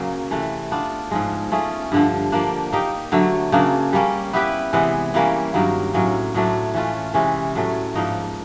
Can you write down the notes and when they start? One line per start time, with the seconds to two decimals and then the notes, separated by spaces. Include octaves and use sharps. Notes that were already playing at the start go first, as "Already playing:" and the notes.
Already playing: C#3 F#3 A#3
0.31 C3 E3 A3
0.71 B3 D4 F4
1.11 G#2 F3 G#3
1.52 A3 C#4 F4 G#4
1.92 G2 D3 F3
2.32 F3 A#3 D4
2.72 A#3 D#4 G4
3.12 D3 F#3 A3
3.52 C#3 F#3 A#3 D4
3.93 G3 A#3 C#4
4.33 B3 E4 G4 B4
4.73 C3 E3 G#3 B3
5.14 E3 G3 A#3 C#4
5.54 G2 D#3 F#3 A#3
5.94 A2 F#3 A#3 C#4
6.34 A2 F#3 A3 D4
6.74 E3 A3 C#4 F4
7.14 C3 E3 G#3 C#4
7.55 A2 F#3 A3
7.95 G#2 F3 A#3 D#4